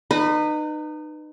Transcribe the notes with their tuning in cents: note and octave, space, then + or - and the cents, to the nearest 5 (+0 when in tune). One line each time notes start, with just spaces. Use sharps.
D#4 -30 B4 +0